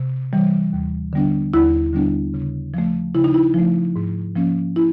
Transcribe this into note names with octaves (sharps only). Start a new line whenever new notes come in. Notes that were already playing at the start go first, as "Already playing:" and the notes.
Already playing: C3
E3 G3
D#2
D3 G3 B3 D4
D#2 E4
D3 G3 B3 D4
C#3
F3 A3
C#3 E4
D#4
E4
F3 A3
G#2
F3 A#3 C#4
E4